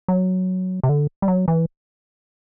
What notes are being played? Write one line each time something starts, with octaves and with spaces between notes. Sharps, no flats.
F#3
C3
D3
G3
F#3
E3